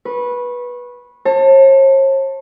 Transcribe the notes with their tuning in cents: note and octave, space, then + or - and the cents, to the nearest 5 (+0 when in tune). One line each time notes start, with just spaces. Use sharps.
B4 -15 C#6 -30
C#5 -45 A5 +20